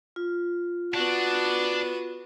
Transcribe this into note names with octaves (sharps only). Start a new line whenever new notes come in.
F4
B3 D4 F#4